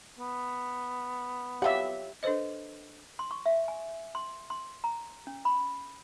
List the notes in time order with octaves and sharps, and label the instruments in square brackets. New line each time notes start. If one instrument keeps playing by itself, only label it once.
[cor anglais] B3
[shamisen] F#3 F4 F#5 [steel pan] G4 E5
[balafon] D4 A4 B4 C5 D#5
[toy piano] C6
C#6
E5
G#5
C6
C6
A#5
C#4
B5